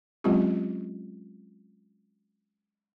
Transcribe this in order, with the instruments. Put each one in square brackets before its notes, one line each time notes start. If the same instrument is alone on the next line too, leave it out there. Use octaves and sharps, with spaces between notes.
[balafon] F#3 G#3 C4 C#4 F4 G4